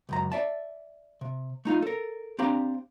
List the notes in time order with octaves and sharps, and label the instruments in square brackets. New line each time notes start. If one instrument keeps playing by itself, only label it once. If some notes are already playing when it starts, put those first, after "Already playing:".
[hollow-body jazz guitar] C#2 F#2 A#5
D5 E5 A5
C3
A3 D#4 F4
A4 A#4
C4 D4 G4 F5 A#5 B5